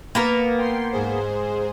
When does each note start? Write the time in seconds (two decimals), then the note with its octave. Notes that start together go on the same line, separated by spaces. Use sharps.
0.15 A#3 B3 A#4
0.58 G5 C6 C7
0.92 G#2 G#4 C5